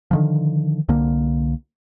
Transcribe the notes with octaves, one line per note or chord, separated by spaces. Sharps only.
D3 D#3 F3
C2 D3 A#3